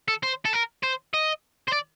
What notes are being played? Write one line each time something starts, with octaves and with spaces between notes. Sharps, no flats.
A4
C5
A4
A#4
C5
D#5
C5
D5